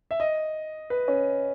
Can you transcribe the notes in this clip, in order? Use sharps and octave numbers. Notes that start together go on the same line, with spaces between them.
E5
D#5
B4
C#4